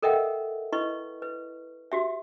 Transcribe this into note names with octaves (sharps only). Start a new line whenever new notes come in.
A4 A#4 D#5 E5 F#5 G5
E4 B4 D#5 C#6
B4
F#4 G4 E5